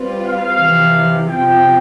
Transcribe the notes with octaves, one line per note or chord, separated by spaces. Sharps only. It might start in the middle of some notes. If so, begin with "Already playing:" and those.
Already playing: G3 C4 F4 B4
F5
F2 C3 E3
C3 F3 C4 G4 G5